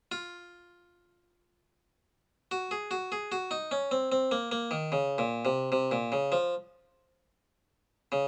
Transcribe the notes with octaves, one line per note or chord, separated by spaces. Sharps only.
F4
F#4
G#4
F#4
G#4
F#4
D#4
C#4
C4
C4
A#3
A#3
D#3
C#3
A#2
C3
C3
A#2
C#3
F3
C#3